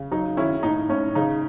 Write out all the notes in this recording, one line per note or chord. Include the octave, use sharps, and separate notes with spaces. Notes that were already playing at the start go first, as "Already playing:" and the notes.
Already playing: C#3
F#3 D#4
D#3 C#4 E4
A2 D#4
A2 C#4
C#3 D#4